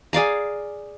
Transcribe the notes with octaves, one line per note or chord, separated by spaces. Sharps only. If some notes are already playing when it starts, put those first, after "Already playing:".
G#4 D5 F5 A#5